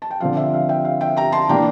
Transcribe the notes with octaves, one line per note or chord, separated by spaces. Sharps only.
A5
G5
D3 F3 C4 F5
E5
F5
E5 G5
F5
E5 G5
G5 A#5
A5 C6
E3 A#3 D4 G5 A#5